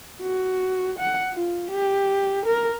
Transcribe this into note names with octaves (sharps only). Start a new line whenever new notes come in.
F#4
F#5
F4
G4
A#4